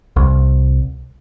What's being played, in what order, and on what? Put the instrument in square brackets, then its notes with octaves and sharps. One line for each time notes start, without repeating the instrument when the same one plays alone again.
[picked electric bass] C2